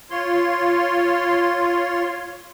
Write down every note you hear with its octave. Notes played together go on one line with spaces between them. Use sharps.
F4 C#5 C6